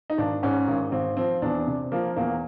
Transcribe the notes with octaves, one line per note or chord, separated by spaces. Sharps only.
D#4
G#1 D4
G#2 C#4
G#1
G#1 C4
F3 C4
E2 D4
C3
F3 A#3
E2 A#3